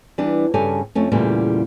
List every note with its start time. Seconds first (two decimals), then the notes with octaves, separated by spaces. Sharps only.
0.18 E3 G3 B3 D4
0.54 G2 C#3 G4 A4 D5 G#5
0.95 F2 A3 C#4
1.12 E2 A#2 C#3 G3 A3